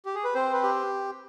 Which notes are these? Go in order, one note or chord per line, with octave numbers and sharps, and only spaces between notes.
G4
G#4
B4
C4 C5
B4
G4